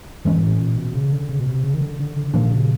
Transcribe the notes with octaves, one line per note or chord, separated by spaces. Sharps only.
G#2 E3 G#3 C#4
G#2
A2
A#2
B2
C#3
D3
C#3
B2
C3
C#3
D#3
D3
D3
D3
D3
A#2 D#3 F3 A#3 D4
C#3